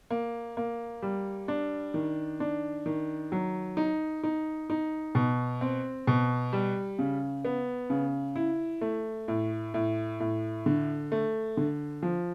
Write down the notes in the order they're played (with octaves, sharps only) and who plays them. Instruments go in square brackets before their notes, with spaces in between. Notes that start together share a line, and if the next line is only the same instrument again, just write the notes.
[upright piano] A#3
A#3
G3
D4
D#3
D4
D#3
F#3
D#4
D#4
D#4
B2
C4
B2
G3
C#3
B3
C#3
E4
A3
A2
A2
A2
D3
A3
D3
F3